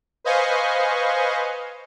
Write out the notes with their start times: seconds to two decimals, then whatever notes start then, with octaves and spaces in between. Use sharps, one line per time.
0.24 B4 C5 D#5 F5 G#5 C#6